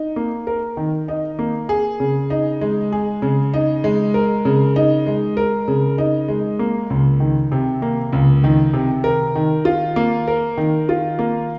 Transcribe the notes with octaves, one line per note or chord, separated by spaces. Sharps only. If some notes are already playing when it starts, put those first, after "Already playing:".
Already playing: D#4
A#3
A#4
D#3
D#4
A#3
G#4
C#3
D#4
G#3
G#4
C#3
D#4
G#3
A#4
C#3
D#4
G#3
A#4
C#3
D#4
G#3
A#3
C#2
D#3
C3
A#3
C#2
D#3
C3
A#4
D#3
F4
A#3
A#4
D#3
F4
A#3